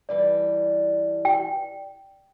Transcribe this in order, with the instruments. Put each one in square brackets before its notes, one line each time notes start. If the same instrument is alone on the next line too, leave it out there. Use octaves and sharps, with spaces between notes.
[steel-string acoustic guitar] G2 E3 G3 [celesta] D5
[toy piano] G5